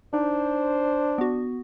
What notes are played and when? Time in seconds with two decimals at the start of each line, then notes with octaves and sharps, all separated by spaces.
0.13 D4 D#4 C5
1.18 B3 F#4